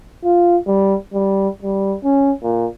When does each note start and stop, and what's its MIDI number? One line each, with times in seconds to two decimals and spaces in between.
0.24 0.57 65
0.67 0.95 55
1.13 1.49 55
1.63 1.94 55
2.04 2.31 61
2.43 2.66 46